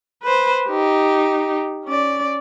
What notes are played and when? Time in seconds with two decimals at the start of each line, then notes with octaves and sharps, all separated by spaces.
0.23 B4 C5
0.69 D#4 G4
1.85 C#4 D5